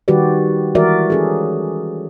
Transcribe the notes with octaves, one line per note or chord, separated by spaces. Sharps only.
D#3 G3 F#4 G4 B4 D5
E3 G#3 F#4 A#4 D5 E5
C#4 G#4 A4